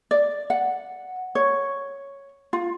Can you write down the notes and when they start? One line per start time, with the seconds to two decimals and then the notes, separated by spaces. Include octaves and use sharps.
0.11 D5
0.50 F#5
1.35 C#5
2.53 F4